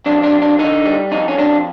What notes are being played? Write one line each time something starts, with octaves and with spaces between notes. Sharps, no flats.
F2 D4
D4
F2
D4
D3 D#4
G3
F2 D#4
C#4
F2 D4